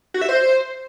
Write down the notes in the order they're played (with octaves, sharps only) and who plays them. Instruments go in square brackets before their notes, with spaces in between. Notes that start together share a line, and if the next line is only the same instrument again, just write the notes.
[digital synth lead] F#4
E5
C5